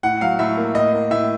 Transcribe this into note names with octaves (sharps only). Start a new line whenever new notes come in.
A2 F#5
F#3 F5
A2 E5
A#3
A2 D#5
A#3
A2 E5